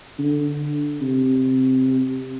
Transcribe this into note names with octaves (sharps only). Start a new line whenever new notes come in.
D3
C3